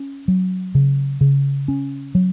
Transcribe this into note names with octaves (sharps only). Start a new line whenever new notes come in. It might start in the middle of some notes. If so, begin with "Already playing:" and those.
Already playing: C#4
F#3
C#3
C#3
C#4
F#3